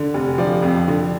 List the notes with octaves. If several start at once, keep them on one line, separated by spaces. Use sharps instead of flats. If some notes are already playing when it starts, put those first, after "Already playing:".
Already playing: D3
F1
F3 D5
F2
D3